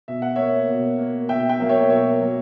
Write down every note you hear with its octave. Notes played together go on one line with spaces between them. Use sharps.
B2 E5
F#5
A#3 C#5 E5
B2
A#3
B2 E5 G5
E5 G5
F#3 A#3
C#5 E5
B2 C#5 E5
F#3 A#3